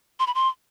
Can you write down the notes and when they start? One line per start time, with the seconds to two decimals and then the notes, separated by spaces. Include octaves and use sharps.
0.20 C6
0.27 B5
0.35 C6